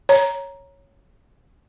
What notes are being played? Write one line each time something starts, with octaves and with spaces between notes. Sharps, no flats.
C#5 A#5